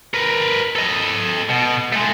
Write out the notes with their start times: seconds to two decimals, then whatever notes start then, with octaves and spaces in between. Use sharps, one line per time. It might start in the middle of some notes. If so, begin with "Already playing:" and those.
0.14 A#4 B4
0.76 A4 D#5
1.50 B2
1.92 G#3 A3